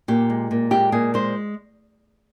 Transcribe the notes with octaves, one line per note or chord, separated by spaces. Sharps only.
A#2 G4
G#3
A#2
G#3 G4
A#2 G#4
G#3 C5